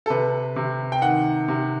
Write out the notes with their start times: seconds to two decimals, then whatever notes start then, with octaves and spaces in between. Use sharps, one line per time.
0.06 A4
0.10 C3 B4
0.56 C3
0.92 G5
1.02 D#3 F#5
1.48 C3